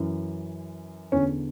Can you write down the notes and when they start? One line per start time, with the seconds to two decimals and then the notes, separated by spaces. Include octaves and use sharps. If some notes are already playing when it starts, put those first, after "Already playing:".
Already playing: F#2 E3
1.12 E2 D3 C#4